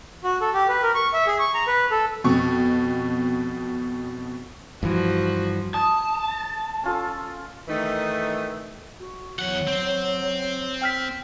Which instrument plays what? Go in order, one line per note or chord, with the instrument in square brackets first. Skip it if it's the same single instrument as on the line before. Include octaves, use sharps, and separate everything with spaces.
[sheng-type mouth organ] F#4
A4
G4
B4
A#4
C#6
E5
G#4
C#6
A#5
B4
A4
[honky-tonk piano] F2 B2 C#6
[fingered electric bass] G2 E3 [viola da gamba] F3 F#4
[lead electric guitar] A5 [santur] D#6
[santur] C#4 F4 A4
[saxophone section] D#3 E3 A3 D#4
[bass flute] F#4
[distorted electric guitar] E2 F#5 [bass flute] F#3
[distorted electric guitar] C4
[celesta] G5 F6 B6